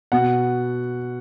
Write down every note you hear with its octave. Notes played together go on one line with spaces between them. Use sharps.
B2 F#5